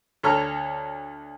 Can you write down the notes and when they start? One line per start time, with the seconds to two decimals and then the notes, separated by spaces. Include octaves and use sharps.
0.23 D2 A4 C#5 A#5 F6